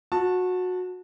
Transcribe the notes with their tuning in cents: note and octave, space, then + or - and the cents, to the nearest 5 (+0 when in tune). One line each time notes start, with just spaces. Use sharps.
F#4 -20 A5 +0